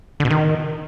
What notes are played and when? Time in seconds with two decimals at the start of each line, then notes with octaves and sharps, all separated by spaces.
0.20 D3
0.25 B2
0.30 D#3